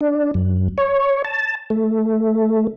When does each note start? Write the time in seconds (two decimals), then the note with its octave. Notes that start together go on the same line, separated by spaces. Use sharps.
0.01 D4
0.34 F#2
0.78 C#5
1.25 A5
1.70 A3